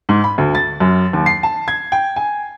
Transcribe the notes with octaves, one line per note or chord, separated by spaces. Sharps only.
G#2
B5
D2
A6
F#2
D#2
C7
A5
G#6
G5
G#5